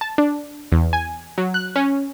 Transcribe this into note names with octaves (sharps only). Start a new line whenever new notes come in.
A5
D4
E2
G#5
F#3
F#6
C#4